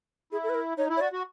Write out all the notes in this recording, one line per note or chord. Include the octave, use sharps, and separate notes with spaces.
E4 G#4
A4
B4
A#4
D#4 C#5
E4
C#5
F#4 D5
F#4